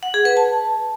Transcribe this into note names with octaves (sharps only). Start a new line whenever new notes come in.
F#5
G#4
B4
A5